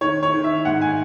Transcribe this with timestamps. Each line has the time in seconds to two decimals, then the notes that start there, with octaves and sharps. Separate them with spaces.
0.01 D#3 C#5
0.23 C#5
0.34 D#3
0.44 E5
0.65 G#2 F#5
0.81 G#5